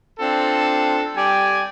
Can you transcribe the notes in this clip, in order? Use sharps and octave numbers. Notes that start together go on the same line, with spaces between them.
C4 D4 F4 A4
G3 D5 G5 G#5